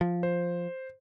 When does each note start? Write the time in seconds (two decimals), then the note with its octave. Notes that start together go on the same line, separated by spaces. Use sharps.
0.01 F3
0.23 C5